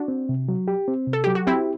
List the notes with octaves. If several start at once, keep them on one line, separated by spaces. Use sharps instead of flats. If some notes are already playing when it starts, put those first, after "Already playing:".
Already playing: D4 F#4
C4
C3
F#3
G4
C4
C3
A4
F#3 G4
F#4
C4 E4 G4